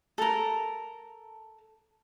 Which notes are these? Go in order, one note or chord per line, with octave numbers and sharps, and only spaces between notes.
A4 A#4